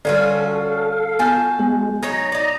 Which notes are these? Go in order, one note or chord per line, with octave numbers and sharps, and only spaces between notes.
D3 G3 C#4 F4 F#4 A4 D5 F5
B3 F4 F#4 G#5 A5 G6
G#3 B3
F#3 D#4 C#5 A#5
D#4 D5